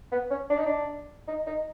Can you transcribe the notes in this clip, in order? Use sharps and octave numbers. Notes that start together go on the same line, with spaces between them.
B3
C#4
D4
D#4
D4
D#4
D#4